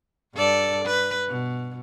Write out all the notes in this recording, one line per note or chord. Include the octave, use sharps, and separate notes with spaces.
G2 A4 D5
B4
B2